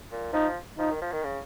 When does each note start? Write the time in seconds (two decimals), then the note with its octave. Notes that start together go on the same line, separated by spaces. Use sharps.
0.11 A#2
0.33 F3 D#4
0.79 F3 D#4
0.90 D#3
1.02 F3
1.12 D#3
1.24 C#3